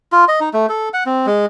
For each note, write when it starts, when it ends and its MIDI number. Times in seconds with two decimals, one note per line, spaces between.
0.12 0.25 65
0.28 0.40 75
0.40 0.49 63
0.53 0.66 57
0.69 0.89 69
0.94 1.04 78
1.06 1.26 60
1.26 1.46 56